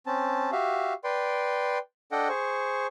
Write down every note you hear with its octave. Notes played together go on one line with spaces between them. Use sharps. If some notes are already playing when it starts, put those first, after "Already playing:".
C4 C#4 A5
F#4 G4 E5 F5
B4 D5 G5 C6
D4 A4 D#5 F#5 G5
G#4 C5 C#6